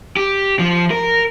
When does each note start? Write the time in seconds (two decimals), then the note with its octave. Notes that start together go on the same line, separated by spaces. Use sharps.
0.16 G4
0.59 F3
0.91 A#4